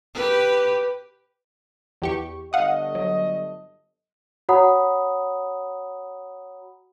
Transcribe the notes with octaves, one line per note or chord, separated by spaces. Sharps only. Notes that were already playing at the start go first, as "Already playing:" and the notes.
G4 B4
E2 G4 C#6
G1 A3 D#5 F5 F#5 D#6
F#3
F#4 C#5 F#5 A#5 B5 D#6